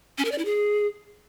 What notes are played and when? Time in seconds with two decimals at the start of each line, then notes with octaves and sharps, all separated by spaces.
0.18 C#4
0.25 A#4
0.32 D5
0.38 E4
0.45 G#4